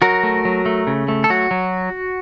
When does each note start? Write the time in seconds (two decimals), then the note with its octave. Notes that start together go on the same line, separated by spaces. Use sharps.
0.02 F#3 F#4 A#4
0.23 A3
0.45 F#3
0.66 A3
0.87 C#3
1.08 A3
1.24 A4
1.30 F#3 F#4
1.51 F#3